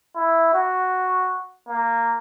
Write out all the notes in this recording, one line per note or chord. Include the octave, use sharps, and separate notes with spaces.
E4
F#4
A#3